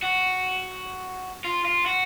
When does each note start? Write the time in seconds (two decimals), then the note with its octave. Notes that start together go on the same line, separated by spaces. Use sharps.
0.02 F#4
1.44 F4
1.65 F4
1.86 F#4